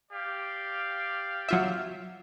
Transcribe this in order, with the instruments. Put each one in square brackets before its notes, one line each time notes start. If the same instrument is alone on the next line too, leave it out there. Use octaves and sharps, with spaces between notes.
[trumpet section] G4 D5 F5
[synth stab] F#3 F4 E5